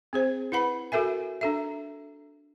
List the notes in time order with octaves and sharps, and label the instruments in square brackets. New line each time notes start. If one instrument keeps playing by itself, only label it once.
[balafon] C4 G#4 C5
E4 B4 F#5 B5
F#4 A4 A#4 E5 G#5
D4 A4 E5